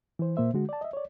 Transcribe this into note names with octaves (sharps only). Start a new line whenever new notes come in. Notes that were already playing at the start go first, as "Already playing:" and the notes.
E3 C5
A#2 A#3 C5 E5
D3 G#3 F#4
D5 A5
D#5 E5
C#5 D5